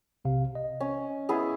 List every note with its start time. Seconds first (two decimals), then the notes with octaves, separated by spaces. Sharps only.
0.25 B1 C3 F5
0.55 D#5
0.80 C#4
1.29 B3 E4 G#4